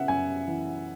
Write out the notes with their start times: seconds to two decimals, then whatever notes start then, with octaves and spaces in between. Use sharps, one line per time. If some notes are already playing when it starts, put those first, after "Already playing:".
Already playing: C#3 B3 E5 F#5
0.08 F#2 G#5
0.48 E3